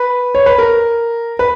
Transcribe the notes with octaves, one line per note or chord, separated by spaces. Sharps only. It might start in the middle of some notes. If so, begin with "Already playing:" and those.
Already playing: B4
C#5
B4
A#4
B4